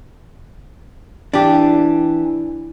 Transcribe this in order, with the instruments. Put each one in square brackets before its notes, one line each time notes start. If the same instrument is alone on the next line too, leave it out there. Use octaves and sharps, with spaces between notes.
[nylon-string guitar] E3 [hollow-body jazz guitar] D4 G4